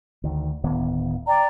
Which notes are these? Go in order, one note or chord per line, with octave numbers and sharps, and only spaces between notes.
D2 D#3
D1 D#3 B3
D5 G5 A#5